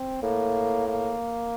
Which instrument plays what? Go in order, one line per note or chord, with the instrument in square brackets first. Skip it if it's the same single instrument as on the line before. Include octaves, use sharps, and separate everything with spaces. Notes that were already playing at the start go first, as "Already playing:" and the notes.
Already playing: [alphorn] C4
[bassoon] A2 [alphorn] A#3
[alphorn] A#3